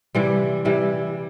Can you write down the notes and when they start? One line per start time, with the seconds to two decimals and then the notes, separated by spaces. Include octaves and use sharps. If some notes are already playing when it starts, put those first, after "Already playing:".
0.15 C3 E3 G3
0.65 C3 E3 G3